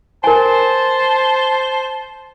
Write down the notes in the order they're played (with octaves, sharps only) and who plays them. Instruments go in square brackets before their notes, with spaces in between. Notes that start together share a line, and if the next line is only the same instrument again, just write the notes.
[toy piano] A#4 G#5 [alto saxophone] C5 [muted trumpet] A5